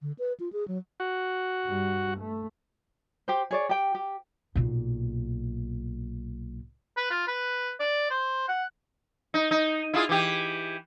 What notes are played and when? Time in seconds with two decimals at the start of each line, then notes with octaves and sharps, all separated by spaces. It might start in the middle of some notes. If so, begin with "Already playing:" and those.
0.02 D3
0.19 B4
0.40 F4
0.53 G#4
0.68 F#3
1.00 F#4
1.65 G2 G3
2.19 A3
3.28 G4 C5
3.51 G#4 C#5 D5
3.69 G4 G5
3.95 G4
4.55 B1 A#2
6.97 B4
7.10 F4
7.28 B4
7.80 D5
8.11 C5
8.48 F#5
9.34 D#4
9.51 D#4
9.94 E4 F4 G#4
10.09 E3 G4